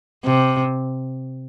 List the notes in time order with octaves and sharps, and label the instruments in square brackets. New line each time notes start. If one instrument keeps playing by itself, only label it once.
[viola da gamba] C3